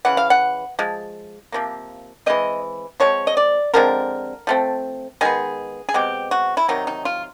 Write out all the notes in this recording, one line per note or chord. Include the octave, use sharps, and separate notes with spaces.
C#3 E3 F#5
F5
F#5
F3 G#3
C3 F3 A#3
E3 G#3 C4 D#5
F3 G#3 C4 C#5
D#5
D5
D3 F3 G#3 C4 A#4
F3 A3 C4
D#3 G#3 B3 G#4
G#4
B2 G#3 C4 G4
F#4
E4
C3 D#3 F#3 D#4
D#4
F4